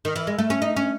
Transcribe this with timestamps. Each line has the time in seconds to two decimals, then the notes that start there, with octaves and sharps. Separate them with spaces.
0.05 D#3
0.16 E3
0.27 G#3
0.39 A3
0.50 C#4
0.62 D#4
0.76 C#4